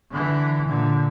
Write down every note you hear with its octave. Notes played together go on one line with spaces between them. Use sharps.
D3 E3
A#2 D3